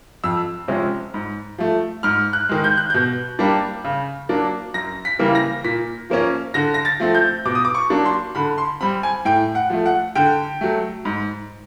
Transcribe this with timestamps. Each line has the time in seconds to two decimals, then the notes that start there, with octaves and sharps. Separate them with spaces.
0.24 F2 E6
0.68 C3 F3 G#3 C#4
1.14 G#2
1.58 F3 A3
2.03 G#2 F6
2.33 F#6
2.49 D#3 G#3
2.64 G6
2.77 F#6
2.90 B2 G6
3.39 G3 A#3 D4
3.84 C#3
4.29 F#3 A#3 D4
4.74 F#2 A#6
5.05 B6
5.19 C#3 E3 G3 A#3
5.35 A#6
5.64 A#2 B6
6.10 F3 A#3 C#4
6.54 D3 A#6
6.74 A#6
6.85 A6
7.00 F3 A3 C4
7.15 G6
7.45 B2 D6
7.55 D#6
7.65 D6
7.74 C#6
7.90 F#3 A#3 D4
8.05 C6
8.35 D3 B5
8.58 C6
8.81 G3 C4 B5
9.03 G#5
9.25 A2 G5
9.55 F#5
9.70 F3 A3
9.86 F#5
10.15 D3 G5
10.61 F#3 A3
11.05 G#2